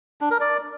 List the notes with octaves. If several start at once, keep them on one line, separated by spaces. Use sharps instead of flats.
D4
A#4
D5